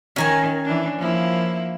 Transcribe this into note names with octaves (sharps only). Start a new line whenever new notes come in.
D#3 C#4 A#4 G#5
E3 D4
F3 A#3 E4